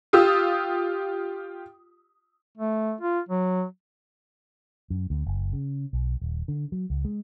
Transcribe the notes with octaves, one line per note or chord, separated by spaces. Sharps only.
F4 G4 D#6 E6
A3
F4
F#3
F#2
D2
F#1
C#3
B1
D#1
D3
F#3
C#2
G#3